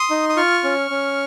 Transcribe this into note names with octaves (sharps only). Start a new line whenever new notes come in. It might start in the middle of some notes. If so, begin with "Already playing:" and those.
Already playing: C6 D#6
D#4
D#6
F4 C#6 F6
C#4
C#4